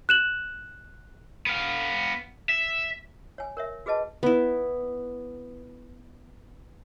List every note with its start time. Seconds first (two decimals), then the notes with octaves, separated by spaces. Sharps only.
0.09 F#6 E7 F#7
1.46 B3 F5
2.49 E5
3.38 C#5 G#5
3.57 A#4 C#5 E5
3.86 F#4 G#4 B4 D#5 A5
4.23 B3 E4